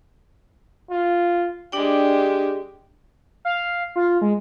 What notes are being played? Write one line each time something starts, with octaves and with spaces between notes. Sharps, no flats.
F4
G#3 D4 G4 D5 G5
F5
F4
G#3